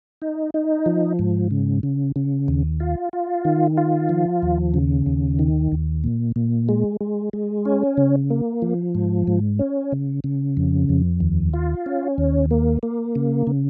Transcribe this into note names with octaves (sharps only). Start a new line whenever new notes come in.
D#4
D#4
F3
G#2
C#3
C#3
C#3
D#2
F4
F4
D#3
F4
F3
D#2
C#3
D#2
D#3
D#2
A#2
A#2
G#3
G#3
G#3
C#4
C#3
A#3
F3
G#2
G#2
C#4
C#3
C#3
F2
F2
D#2
F4
C#4
D#2
A#3
A#3
C#3
C#3